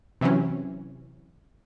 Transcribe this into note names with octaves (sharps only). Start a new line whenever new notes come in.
C3 E3 F#3 C4 C#4